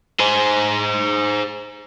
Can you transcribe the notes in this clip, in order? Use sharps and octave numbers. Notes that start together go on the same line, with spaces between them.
G#4 C5